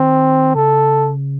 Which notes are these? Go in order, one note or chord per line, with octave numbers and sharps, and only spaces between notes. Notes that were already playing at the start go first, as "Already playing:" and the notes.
Already playing: D#3 C4
C#3 A4